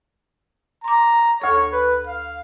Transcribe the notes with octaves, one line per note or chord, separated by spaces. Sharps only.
A#5 C6 D6
D2 A4 C#5
B4
F5